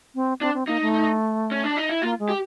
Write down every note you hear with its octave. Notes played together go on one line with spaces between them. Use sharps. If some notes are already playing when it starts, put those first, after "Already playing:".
C4
C4 D4
C4
A#3 D#4
A3
C#4
D4
D#4
E4
A#3 F4
G#3
G4